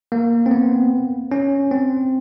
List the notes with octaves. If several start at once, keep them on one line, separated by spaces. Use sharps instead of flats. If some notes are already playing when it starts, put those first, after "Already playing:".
A#3
C4
B3
C#4
C4